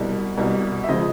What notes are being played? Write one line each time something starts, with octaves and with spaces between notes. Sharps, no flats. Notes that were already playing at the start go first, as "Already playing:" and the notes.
Already playing: C2 B2 G3 D5
C2 B2 G3
E5
C#3 F3 G#3 D#5